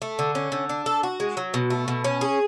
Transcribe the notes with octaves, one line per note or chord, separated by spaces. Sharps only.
A3
D3
C#4
D3
D4
A4
F#4
G#3
F#3
B2
A3
B2
C#4
G#4